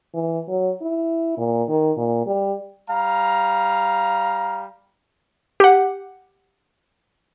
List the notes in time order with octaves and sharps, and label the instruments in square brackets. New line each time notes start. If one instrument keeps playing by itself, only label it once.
[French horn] E3
F#3
E4
A#2
D#3
A#2
G3
[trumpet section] G3 F5 A#5
[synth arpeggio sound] G4 F#5